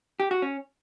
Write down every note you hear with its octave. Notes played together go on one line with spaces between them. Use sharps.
G4
F#4
C#4